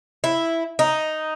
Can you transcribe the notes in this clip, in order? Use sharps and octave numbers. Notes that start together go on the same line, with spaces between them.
E4
D#4